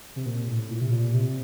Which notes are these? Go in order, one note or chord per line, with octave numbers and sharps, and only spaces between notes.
C3
A#2
A2
A#2
C3
A#2
C3